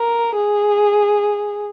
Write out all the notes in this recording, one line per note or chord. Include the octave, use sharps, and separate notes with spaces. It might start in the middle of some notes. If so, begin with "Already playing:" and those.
Already playing: A#4
G#4